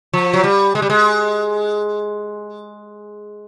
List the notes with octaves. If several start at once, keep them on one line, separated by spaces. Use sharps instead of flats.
F3
F#3
G3
G#3
G3
G#3